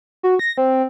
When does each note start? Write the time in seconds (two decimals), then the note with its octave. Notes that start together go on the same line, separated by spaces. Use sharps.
0.23 F#4
0.39 A#6
0.58 C4